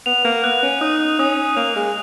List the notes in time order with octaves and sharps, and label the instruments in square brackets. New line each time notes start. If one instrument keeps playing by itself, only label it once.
[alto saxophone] B3 [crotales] F7
[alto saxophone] A#3
[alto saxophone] B3 [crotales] F#6
[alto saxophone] C#4
[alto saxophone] D#4 [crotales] D#6
[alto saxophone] C#4 [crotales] D#6
[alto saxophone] A#3 [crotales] F7
[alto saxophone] G#3